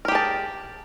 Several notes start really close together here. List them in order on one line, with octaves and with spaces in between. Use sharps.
A#4 G4 G#4 A5